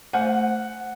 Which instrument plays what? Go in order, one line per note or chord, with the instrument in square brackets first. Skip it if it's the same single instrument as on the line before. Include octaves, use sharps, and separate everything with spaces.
[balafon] A3 C5 G#5 [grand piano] F#5